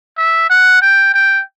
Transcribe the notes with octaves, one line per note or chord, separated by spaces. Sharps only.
E5
F#5
G5
G5